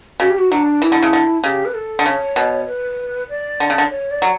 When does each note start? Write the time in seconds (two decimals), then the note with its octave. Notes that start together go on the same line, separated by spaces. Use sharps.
0.20 C#3 F#4
0.30 G4
0.38 F#4
0.51 F#3 D4
0.82 E3 E4
0.92 D3
1.03 C#3
1.13 D3
1.44 C#3 G4
1.65 B4
1.74 A4
1.99 D3
2.06 C#3 C#5
2.36 B2
2.68 B4
3.30 D5
3.60 D3
3.70 C#3
3.78 D3
3.91 C#5
4.11 D5
4.22 F#3